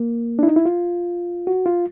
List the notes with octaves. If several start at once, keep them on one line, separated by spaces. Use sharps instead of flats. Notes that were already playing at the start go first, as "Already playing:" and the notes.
Already playing: A#3
D4 E4
D#4
E4
F4
F#4
F4